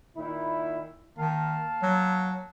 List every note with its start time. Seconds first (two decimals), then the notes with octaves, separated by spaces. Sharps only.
0.17 A#2 D#3 E4
1.18 D#3 A#3 F5 A5
1.83 F#3